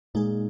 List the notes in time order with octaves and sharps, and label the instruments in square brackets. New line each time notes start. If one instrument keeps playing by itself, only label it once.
[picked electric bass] A#2 [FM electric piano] G#3 D#4 G#4